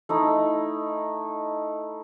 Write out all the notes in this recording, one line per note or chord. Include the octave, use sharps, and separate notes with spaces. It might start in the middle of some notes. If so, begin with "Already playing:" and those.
A3 D#4 E4